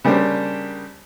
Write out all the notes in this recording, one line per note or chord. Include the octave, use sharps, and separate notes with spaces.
C#3 G3 A#3 D4 G4 C5